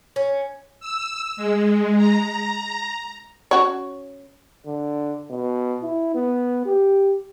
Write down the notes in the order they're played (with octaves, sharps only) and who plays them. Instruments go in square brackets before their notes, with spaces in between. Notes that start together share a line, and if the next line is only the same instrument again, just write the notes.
[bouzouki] C#4
[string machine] E6
G#3
A#5
[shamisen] C#4 F#4 C#5
[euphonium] D3
B2
E4
B3
G4